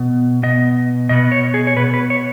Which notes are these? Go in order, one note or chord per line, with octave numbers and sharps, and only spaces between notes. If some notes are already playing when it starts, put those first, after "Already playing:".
Already playing: B2 B3
B2 B3 D#5
B2 B3 D#5
C#5
G#4
C#5
B2 B3 B4
B4
C#5